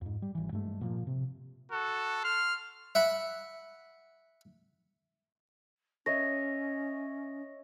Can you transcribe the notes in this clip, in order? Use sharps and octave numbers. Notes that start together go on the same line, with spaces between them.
F2 G#2
G3
G#1 E3
G2 G#3 A3
A#2 F3 A#3
C3
F#4 A4
C6 F6
E5 F#5 B5
C#4 C#5 D#5 E5 A#6